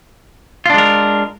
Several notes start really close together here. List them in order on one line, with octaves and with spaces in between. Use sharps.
F4 D4 G#3 A#4